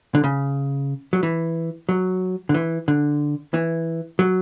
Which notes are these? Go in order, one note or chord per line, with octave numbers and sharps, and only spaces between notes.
D3
C#3
F#3
E3
F#3
D3
E3
D3
E3
F#3